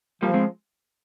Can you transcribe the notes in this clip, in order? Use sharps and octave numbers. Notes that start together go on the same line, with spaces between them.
F3 G3 A#3
G#3 C4